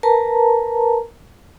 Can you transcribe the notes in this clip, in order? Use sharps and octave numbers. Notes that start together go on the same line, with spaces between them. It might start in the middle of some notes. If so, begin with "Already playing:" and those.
A#4 B4 A5 A#5